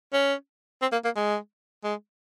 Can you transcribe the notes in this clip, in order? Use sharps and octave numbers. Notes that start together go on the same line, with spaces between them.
C#4
C4
A#3
A#3
G#3
G#3